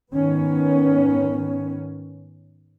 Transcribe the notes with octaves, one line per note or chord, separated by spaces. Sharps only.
G#2 D#3 B3 C#4